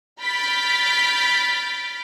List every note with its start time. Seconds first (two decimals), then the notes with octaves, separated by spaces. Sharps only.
0.21 B5 F6 G6 A6 B6 D7